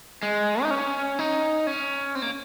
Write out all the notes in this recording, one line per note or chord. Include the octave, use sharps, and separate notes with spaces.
G#3
D#4
C#4
D#4
C#4
C4
A#3